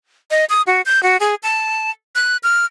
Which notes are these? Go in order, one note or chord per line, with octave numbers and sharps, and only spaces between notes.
D#5
D#6
F#4
G6
F#4
G#4
A5
F#6
F6